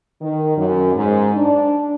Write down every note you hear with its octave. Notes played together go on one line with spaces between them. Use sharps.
D#3
F#2
G#2
D4